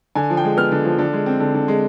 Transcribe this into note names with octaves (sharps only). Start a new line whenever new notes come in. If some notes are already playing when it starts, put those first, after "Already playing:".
D3 G#5
F3
G5
G#3
B3 F6
D3
F3
D3
G#3
C4
D3
D3
G#3